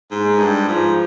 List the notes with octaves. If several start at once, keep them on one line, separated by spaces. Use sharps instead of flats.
G#2
G#3
G2
G#2 F3